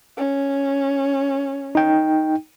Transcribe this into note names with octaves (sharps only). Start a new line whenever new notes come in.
C#4
D#4 G5